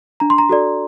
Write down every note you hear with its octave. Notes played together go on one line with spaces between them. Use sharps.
D4 A#5
C6
A#5
F#4 A4 D5